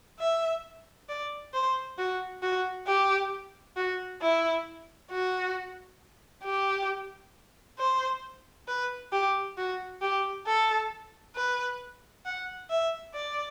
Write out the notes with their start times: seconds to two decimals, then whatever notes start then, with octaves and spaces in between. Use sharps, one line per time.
0.19 E5
1.09 D5
1.53 C5
1.98 F#4
2.42 F#4
2.87 G4
3.76 F#4
4.21 E4
5.11 F#4
6.45 G4
7.79 C5
8.68 B4
9.12 G4
9.58 F#4
10.02 G4
10.47 A4
11.36 B4
12.25 F#5
12.70 E5
13.14 D5